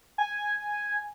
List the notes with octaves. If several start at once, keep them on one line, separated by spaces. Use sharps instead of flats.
G#5